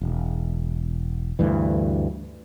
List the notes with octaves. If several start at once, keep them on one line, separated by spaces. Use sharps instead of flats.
E1
D2 G2 E3